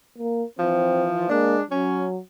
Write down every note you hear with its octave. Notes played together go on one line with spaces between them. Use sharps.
A#3
E3 F3 C4
G#3 A#3 D4
F#3 C#4